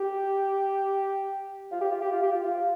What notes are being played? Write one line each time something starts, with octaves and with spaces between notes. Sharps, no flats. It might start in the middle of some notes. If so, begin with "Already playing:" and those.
Already playing: G4
F4
G4
F4
G4
F4
G4
F4
F4